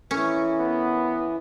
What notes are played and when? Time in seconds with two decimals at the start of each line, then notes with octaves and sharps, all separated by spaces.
0.11 E3 C#4 A4 A#4 C#6
0.59 B3